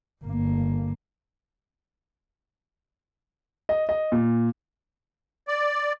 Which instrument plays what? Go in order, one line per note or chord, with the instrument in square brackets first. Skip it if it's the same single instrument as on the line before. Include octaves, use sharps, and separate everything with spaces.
[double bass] G1 A#3
[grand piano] D#5
D#5
A#2
[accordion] D5